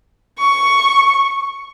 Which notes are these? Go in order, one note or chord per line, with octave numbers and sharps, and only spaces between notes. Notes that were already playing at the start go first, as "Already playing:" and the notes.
C#6